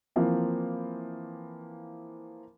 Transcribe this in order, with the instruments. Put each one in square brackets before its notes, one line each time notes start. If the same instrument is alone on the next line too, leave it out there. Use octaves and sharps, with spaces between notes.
[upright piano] E3 F3 A#3 C4